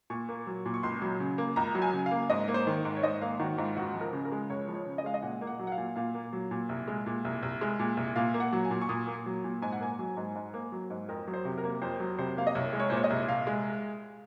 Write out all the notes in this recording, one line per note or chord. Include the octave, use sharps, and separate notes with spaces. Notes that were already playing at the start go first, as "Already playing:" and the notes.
A#2 C#6
A#3
F#3
A#2
C#6
C#2 C6
F#3
C#3
A#3
C#2 A#5
F#3
G#5
C#3
F5
A#3
G#2 D#5
A#3
C5
D#3
G#2
C#5
G#2 D#5
A#3 F5
D#3 F#4
G#2 F4
C#2 F#4
F3
A#4
C#3
A#4
G#3
C#2 C#5
F3
C#5
C#3
D#5
G#3 F5
D#5
A#2 F#5
A#3
F#5
F#3
F#5
F5
A#2
A#2 F5
A#3
F#3
A#2
C2
G#3
A#2
C2
C2
G#3
A#2
C2
A#2 F5
A#3
F#5
F#3
G#5
A#2
C#6
A#2 D#6
A#3
F#3
A#2
G#2 G#5
F#5
A#3 G#5
F#3
G#2
G#2
A#3
F#3
G#2
F2 A#4
F#3
C5
C3
A#4
A#3
F2 C5
F#3
C3 C5
A#3 F5
D#5
C2 C#5
G#3
C#5
A#2 C5
C#5
D#5
C2
C2 F5
G#3